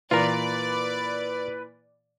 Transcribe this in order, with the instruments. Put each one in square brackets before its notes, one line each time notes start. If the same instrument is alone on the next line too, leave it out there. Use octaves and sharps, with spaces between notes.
[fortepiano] A#2 E3 [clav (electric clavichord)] F4 A#4 [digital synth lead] B4 [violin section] D5